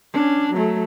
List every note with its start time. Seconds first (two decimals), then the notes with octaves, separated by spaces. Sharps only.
0.13 C#4 D4
0.53 F#3 A3